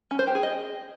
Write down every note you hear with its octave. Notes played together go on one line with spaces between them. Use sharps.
C#4
C5
G4
G#4
D#5